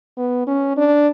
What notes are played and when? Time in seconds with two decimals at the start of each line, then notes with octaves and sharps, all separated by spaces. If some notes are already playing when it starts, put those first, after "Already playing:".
0.18 B3
0.47 C#4
0.77 D4